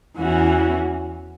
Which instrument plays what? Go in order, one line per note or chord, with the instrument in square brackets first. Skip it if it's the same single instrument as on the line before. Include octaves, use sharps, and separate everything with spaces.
[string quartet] E2 E3 C#4 F#4